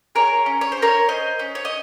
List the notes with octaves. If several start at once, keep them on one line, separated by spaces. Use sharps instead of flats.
G#4 A#4 C#5
C#4
C#5
C5
C#4
A#4 C#5
C#4 C5 D#5
C#4
C#5
D#5